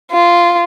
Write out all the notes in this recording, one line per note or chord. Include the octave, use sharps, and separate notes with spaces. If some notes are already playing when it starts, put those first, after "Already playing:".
F4